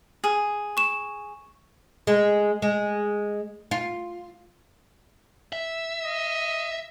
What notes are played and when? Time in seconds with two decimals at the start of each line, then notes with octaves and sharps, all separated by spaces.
0.24 G#4
0.77 C#6 E7
2.07 G#3
2.62 G#3
3.71 F4
5.53 E5
6.04 D#5